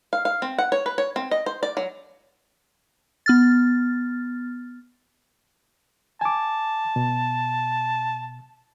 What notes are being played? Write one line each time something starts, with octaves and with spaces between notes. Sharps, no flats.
F5
F5
C4
F#5
C#5
B4
C#5
C4
D#5
C5
D5
F#3
B3 F6 A6
G#5 A5 D6
B2